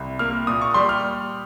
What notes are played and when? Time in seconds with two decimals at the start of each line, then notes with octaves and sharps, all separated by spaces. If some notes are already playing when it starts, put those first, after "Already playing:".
Already playing: C2
0.19 A#3 F6
0.47 A#2 D#6
0.61 C#6
0.74 G3 C6
0.89 F6